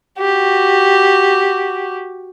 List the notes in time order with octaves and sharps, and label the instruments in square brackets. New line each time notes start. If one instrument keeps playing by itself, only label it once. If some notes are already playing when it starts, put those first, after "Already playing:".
[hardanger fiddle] F#4 G4